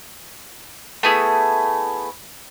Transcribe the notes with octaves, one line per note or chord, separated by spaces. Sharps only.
A3 B3 E4 G#4